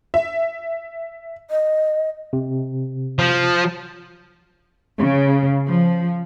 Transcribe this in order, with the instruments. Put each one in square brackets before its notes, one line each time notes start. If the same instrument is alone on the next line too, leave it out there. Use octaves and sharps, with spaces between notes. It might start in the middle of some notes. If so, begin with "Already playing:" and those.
[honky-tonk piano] E5
[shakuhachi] D#5
[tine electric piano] C3
[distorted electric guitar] F3
[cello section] C#3
F3